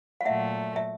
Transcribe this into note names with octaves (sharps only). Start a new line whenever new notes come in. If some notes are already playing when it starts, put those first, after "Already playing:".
F5
A#2 F#3 A3 E5 F#5
E5